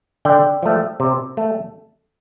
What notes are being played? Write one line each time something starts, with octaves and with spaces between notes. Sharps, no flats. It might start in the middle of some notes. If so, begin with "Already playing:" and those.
D3 D5 G5
F3 A3
C3
A3